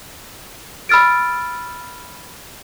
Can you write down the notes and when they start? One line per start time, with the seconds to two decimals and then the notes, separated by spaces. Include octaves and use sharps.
0.89 B5 E6 F6 A6 D7